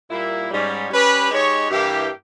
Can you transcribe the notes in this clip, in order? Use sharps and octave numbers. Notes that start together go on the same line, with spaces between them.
A#2 G3 A#3 E4
G#2 G3 C#4
G3 C#4 G4 B4
G#3 D#4 G4 C#5
G2 E3 A#3 E4 G4